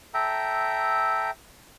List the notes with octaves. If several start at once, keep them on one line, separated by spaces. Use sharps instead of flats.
A4 E5 G5 A#5